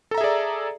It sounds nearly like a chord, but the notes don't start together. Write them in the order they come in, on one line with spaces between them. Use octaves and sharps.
A4 A#5 E5 G#4 D5